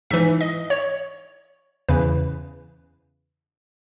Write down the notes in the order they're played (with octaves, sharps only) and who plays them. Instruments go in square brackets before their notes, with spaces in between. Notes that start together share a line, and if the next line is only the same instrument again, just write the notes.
[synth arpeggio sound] G#2 E3 E5
D#5
C#5
E2 C#3 E3 B4